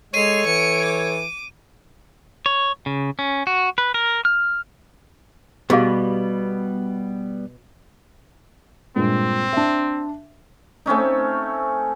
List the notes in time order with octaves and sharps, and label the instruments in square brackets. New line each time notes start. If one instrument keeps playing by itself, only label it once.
[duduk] G#3 [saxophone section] A4 C#5 [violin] C7 F7 [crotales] D#7
[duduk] E3 [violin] C#7 D7
[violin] D6
[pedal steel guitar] C#5
C#3
C#4
F#4
B4
A#4
F6
[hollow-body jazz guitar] B2 [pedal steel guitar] G3 B3 [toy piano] G4 G#4 F5
[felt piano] G2 A#2 G#3 [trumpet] C4
[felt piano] D4 E5
[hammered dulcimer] A3 C4 C#4 D#4